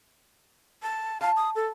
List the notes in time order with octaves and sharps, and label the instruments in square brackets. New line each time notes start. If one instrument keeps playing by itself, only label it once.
[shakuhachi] A5
[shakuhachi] F5 [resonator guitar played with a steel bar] A5
[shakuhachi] D#6
A4